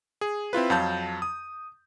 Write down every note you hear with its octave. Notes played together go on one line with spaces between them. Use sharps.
G#4
C4 E4 F4 B4
F2 F#3 F5 A5 G6
D#6